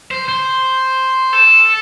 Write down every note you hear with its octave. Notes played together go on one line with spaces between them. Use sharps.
C5
C5
A4